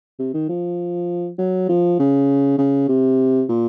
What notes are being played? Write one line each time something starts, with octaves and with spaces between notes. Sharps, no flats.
C3
D#3
F3
F#3
F3
C#3
C#3
C3
A#2